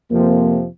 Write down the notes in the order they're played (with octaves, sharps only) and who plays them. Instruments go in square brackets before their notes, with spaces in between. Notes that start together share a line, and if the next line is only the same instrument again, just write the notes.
[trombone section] F2 C3 F3 [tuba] A#3